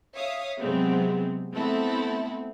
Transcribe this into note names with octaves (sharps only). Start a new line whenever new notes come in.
C#5 E5 F5 D#6
C3 F#3 G#3 B3 C4
A3 B3 C4 E4 A4